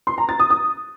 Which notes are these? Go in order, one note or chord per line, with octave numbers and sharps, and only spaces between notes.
C6
A#5
A6
D#6
D#6